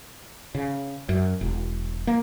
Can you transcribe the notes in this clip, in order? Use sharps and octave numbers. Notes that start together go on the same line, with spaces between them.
C#3
F#2
E1
A#3